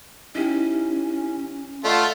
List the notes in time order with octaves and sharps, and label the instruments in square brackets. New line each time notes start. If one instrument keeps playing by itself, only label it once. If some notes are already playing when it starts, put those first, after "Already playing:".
[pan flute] C#4 [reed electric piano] D#4 E4 G4
[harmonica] A3 F4 [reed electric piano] D5 D#5 F#5